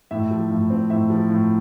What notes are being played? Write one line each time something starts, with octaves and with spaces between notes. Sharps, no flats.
A2 E5
F3
A2
C4
A2 E5
F3
A2